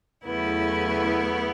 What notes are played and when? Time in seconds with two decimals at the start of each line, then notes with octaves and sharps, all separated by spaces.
0.24 E2 C#3 F#3 A3 B3 E4